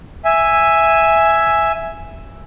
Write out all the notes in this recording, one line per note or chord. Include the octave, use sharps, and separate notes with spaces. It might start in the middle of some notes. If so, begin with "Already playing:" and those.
E5 G#5